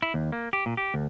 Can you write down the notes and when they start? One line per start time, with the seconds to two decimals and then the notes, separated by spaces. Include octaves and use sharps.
0.02 E4
0.14 D#2
0.32 A#3
0.53 G4
0.66 A#2
0.77 G4
0.94 D2